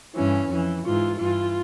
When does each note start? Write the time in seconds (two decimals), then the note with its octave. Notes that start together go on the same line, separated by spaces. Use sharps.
0.15 G2 E3 C#4
0.49 F2 E3
0.84 G#2 E3 F4
1.19 G2 E3 F4